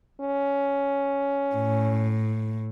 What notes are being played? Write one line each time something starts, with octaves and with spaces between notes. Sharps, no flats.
C#4
A2